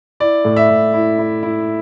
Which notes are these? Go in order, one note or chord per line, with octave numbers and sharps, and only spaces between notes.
E4 D5
A2
E5
A2
E4
E4
E4